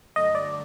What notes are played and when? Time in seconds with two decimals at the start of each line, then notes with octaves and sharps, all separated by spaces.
0.16 G2 D3 F#3 A3 D#5
0.35 D5